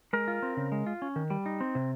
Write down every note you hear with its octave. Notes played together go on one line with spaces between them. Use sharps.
G#3 A#4
F4
C4
C#3
G#3
F4
C#4
D#3
G3
D#4
C4
C3